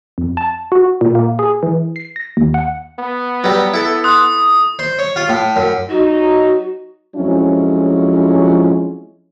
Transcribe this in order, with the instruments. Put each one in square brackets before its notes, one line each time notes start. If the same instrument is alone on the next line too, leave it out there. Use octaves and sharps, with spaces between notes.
[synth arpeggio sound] F2
A5
F#4
A#2
A#3
G#4
E3
C7
A#6
D#2
F#5
[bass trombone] B3
[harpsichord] F#3 G3 [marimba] B4
[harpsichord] E4 A4
[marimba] C6 F#6 [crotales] D#6
[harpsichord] C5
C#5
F4
A2
F#2
[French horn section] F#3 D#4 [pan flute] F#4
[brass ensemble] F2 F3 F#3 G#3 C#4 E4